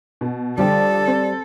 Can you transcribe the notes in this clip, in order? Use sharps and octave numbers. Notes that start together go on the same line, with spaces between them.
B2
D3 F3 G3 G4 A4 D5
C4